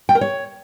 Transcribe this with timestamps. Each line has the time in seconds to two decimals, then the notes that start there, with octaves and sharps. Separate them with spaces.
0.09 G5
0.15 A#4
0.21 C#5